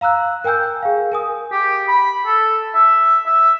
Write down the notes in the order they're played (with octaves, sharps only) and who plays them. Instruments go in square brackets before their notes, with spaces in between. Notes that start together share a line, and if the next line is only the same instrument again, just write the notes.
[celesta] F5 A#5 E6 F#6
A#4 G5 G#5 E6 G6
G#4 F5
A#4 G#5 D#6
[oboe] G4
B5
A4
E5
E5